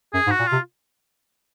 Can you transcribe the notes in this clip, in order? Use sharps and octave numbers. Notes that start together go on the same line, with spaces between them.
F#2 G#4
G#2
F#4
A#2
C3 F4